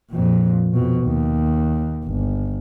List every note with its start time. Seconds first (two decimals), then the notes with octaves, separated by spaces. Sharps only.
0.11 F2 A#2
0.73 F2 B2
1.04 D#2
2.06 G1